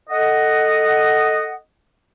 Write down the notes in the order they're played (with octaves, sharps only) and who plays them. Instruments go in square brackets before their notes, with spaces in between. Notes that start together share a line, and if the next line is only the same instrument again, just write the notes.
[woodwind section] A4 D#5 F#5